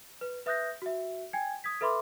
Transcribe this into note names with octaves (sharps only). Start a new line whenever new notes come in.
B4
B4 E5 D#6 F#6 G6 A#6
F#4 E5
G5 G#5 G#6
D#6 G#6 B6
A4 B4 E5 B5 C6 D6